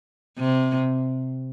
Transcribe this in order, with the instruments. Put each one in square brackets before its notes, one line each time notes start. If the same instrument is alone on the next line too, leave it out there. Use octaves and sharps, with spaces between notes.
[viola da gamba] C3